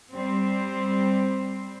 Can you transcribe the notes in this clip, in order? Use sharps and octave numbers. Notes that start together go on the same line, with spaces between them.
G3 C4 C5